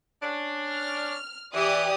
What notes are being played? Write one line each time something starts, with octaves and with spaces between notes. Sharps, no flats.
C#4 D4
F6
E3 G4 D5 D#6